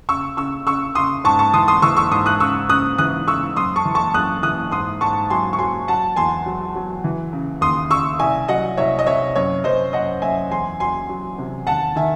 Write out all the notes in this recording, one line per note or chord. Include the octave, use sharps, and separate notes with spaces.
C#3 C#6 E6
C#3 C#6 E6
C#3 C#6 E6
C#3 C6 D#6
G#2 A5 C#6
A5 C#6
E3 C6 D#6
C6 D#6
E3 C#6 E6
C#6 E6
G#2 C6 D#6
D#6 F#6
C#3 C#6 E6
C#3 D#6 F#6
E3 D#6 F#6
C#3 C#6 E6
F#2 C6 D#6
A5 C#6
E3
A5 C#6
F#2 D#6 F#6
E3 D#6 F#6
G#2 C6 D#6
G#2 A5 C#6
F#3 G#5 C6
C#6
F#3 G#5 C6
F#3 F#5 A5
E2 G#5 C6
F#3
F#3
E3
C#3
D#2 C6 D#6
C#3 C#6 E6
C2 E5 G#5
F#3 D#5 F#5
C2 C#5 E5
D#5
C3 C#5 E5
F#2 C#5
F#2 C5 D#5
F#2 D#5 F#5
F#2 E5 G#5
E2 G#5 C6
F#3 G#5 C6
F#3
C3
D#2 F#5 A5
D#3 E5 G#5